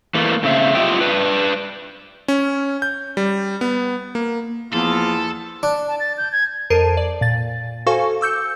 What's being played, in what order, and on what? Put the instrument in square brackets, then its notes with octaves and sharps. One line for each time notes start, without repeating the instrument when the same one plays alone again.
[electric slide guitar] E3 A3 A#3
A2 C#3 C4 E5 F5
F4 G4 D#5 E5 G5
D4 B4
[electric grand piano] C#4
G6
G3
B3
A#3
[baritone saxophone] E2 [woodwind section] F3 A#3 B3 [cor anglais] F4 [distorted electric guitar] A4
[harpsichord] D4
[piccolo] A5
A6
G6
G#6
[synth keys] F2 A#4 A5 C7 D7 D#7
D5
A#2 A6
F#4 A4 C5 F5 G#5 C#6
D6 E6 G6 C#7